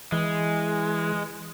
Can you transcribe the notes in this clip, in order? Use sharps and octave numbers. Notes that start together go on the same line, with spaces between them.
E3 G#3